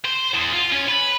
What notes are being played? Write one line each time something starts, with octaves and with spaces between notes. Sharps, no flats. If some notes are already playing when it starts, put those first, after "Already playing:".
C5
E2
F4
C#4
B4